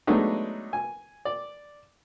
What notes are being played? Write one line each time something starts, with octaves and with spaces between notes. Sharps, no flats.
F#3 G#3 A3 B3 D4 D#4
G#5
D5